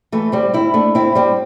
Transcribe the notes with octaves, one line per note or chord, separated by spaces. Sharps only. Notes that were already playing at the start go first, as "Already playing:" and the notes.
E3 A3
G3 C4
C4 E4
A3 D4
C4 E4
G3 C4